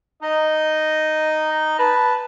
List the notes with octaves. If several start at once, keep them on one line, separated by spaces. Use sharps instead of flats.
D#4 D#5
B4 A5